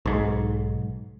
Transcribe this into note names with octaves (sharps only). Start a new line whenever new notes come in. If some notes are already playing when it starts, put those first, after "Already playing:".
B1 G#2